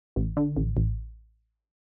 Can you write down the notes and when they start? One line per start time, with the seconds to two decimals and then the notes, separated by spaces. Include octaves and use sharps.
0.16 A1
0.37 D3
0.57 A1
0.77 A1